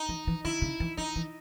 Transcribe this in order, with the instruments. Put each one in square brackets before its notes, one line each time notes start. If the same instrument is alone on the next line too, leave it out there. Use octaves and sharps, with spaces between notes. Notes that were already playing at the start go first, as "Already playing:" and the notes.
Already playing: [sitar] D#4
[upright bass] E3
E3
[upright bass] D#3 [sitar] E4
[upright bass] C#3
E3
[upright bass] E3 [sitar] D#4
[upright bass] E3